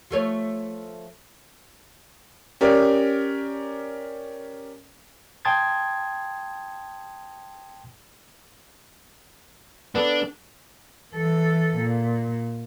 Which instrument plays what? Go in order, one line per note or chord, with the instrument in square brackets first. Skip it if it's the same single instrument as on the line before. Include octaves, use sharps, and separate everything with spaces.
[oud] F3 A3 C#5
[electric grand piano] C#4 G4 A#4 D5
[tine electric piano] G5 A5 C6 D#6 G#6 A6
[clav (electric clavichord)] B3 A4 [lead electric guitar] D4
[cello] E3 A4
A#2